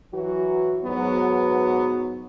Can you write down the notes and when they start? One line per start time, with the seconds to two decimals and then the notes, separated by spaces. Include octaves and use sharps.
0.13 E3 F#3 F#4
0.84 G#2 F#3 B3